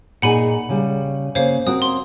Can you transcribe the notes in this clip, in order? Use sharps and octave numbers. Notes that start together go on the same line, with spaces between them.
A#2 D#4 G#4 F#5 B5 D#7
C#3 G3
C#3 A#3 C5 C#5 F5
C4 F#4 A#4 D#6
C6